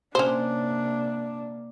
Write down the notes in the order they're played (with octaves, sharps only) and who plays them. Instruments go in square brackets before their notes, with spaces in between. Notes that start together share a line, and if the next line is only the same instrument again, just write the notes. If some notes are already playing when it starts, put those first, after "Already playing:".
[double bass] C3 A#3 [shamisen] C#4 C5 [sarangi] D4